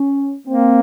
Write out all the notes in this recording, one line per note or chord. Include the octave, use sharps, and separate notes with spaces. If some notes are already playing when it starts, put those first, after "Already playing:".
Already playing: C#4
A#3 C4